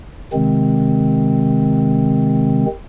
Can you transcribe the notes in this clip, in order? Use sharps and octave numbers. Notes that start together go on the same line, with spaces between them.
C3 D#3 G#3 C4